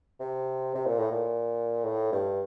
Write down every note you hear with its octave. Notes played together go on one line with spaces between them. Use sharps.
C3
C3
A#2
A2
A#2
A2
G2